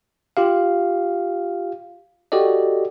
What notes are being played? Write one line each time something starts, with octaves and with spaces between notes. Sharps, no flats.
F4 G4 F5
F#4 G4 A4 D5 D#5